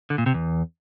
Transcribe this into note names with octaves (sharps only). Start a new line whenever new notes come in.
D3
A#2
C3
E2